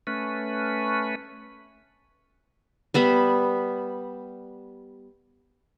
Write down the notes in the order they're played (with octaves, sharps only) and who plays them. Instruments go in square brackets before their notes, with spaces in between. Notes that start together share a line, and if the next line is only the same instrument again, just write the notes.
[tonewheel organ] A3 C#4 B4
[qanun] G3 B3 E5 B5